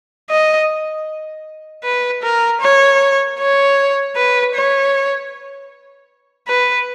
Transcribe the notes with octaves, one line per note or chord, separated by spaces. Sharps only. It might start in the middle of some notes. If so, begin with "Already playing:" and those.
D#5
B4
A#4
C#5
C#5
B4
C#5
B4